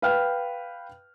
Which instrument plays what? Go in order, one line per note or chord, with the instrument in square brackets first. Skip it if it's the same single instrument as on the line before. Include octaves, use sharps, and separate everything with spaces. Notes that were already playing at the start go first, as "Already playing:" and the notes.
[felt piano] B4 F5 G5 F6